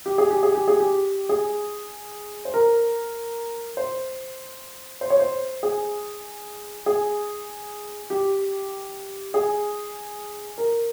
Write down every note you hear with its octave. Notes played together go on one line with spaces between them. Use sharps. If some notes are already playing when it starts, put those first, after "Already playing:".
G4
G#4
G4
G#4
G4
G#4
G4
G#4
C5
A#4
C5
C5
C#5
C5
G#4
G#4
G4
G#4
A#4